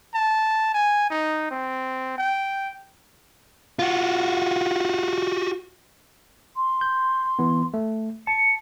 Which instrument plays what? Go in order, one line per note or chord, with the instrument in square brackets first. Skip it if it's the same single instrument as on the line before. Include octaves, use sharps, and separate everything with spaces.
[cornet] A5
G#5
D#4
C4
G5
[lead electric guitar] F4 F#4
[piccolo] C6
[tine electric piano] G6
E3 B3
A3
[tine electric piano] A5 [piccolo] C#7